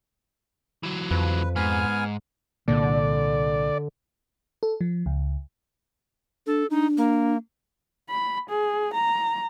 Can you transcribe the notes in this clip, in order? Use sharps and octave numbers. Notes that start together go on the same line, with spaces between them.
E3 F#3
F2 B4
G#2 B3 G#5 F6
C2 A#2 D3 A#3 D5
A4
F3
C#2
D4 A4
D4 D#4
A#3
B5
G#4
A#5